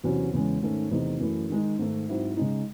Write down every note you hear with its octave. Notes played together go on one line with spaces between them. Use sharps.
E2 C3 F#3 C#4 F#4
E2 C#3 G#3 C#4
G#2 D#3 A3 C#4
E2 C3 D#3 A3 D#4
F#2 E3 A3 C#4
D#3 G#3 D#4
G#2 D#3 A3
G#2 F#3 C4 E4
C#3 G#3 D#4